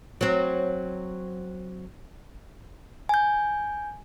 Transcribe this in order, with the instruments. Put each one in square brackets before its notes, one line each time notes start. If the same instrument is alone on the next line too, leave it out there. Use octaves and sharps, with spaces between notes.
[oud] F#3 C4
[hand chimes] G#5 G6